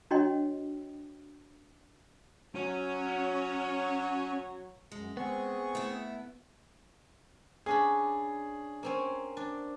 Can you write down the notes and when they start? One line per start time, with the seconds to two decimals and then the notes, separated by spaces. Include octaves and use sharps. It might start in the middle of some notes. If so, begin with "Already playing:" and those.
0.11 D4 F#4 C#5 D#5 G5 C6
2.55 F#3 C#4 C#5
4.92 F#2 G#3
5.17 B3 C4 G#4 C#6
5.75 A3 E4
7.66 C#4 D4 G#4 B5
8.83 A#3 C4 C#4
9.37 D4